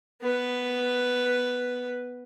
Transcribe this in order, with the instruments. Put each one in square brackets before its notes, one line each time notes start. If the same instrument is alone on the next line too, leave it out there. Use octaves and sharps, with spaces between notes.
[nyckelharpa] B3 B4